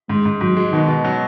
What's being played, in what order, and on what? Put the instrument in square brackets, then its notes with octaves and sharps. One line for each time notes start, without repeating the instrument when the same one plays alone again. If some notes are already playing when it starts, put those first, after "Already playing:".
[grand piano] G#2 [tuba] G#3
[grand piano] G#2
[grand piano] G#2 [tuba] F#3
[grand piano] G#3
[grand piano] B2 [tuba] D#3
[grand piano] B2
F#3